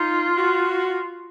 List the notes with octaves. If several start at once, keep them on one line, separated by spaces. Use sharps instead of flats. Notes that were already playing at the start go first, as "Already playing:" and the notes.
Already playing: D#4 F4
F#4